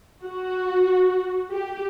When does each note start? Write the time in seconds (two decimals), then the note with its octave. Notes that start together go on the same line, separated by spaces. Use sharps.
0.23 F#4
1.51 G4